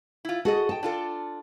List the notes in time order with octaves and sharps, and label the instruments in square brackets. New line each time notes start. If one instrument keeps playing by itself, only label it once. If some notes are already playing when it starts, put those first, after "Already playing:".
[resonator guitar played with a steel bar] E4 F4
[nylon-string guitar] F#4 G#4 [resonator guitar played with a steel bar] A4 D#5
[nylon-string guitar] G5 A5
[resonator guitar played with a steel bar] D4 F4 A4